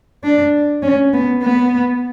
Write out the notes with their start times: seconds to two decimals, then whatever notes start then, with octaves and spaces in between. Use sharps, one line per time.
0.23 D4
0.83 C#4
1.13 B3
1.43 B3